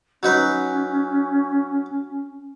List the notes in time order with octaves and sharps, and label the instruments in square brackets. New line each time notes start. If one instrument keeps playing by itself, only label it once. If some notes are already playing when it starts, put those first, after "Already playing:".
[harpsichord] F#3 D#4 B4 [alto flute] C#4